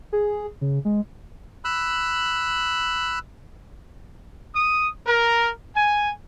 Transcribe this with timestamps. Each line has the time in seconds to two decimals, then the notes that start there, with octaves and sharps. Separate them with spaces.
0.13 G#4
0.61 C#3
0.85 G#3
1.65 B5 E6 F#6
4.55 D#6
5.07 A#4
5.75 G#5